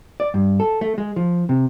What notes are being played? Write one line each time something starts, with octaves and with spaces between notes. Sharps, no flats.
D5
G2
A4
A3
G#3
F3
C3